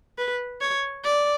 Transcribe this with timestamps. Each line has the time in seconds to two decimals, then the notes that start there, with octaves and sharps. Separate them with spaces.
0.18 B4
0.61 C#5
1.04 D5